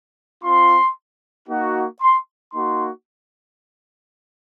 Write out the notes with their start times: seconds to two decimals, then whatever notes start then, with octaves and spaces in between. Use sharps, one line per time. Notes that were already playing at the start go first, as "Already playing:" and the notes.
0.43 C4 F4 C6
1.48 A#3 D#4 F#4
2.01 C6
2.52 A#3 D#4 F#4 C6